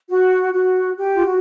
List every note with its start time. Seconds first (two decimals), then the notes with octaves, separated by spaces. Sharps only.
0.09 F#4
0.53 F#4
0.97 G4
1.14 F4
1.25 F#4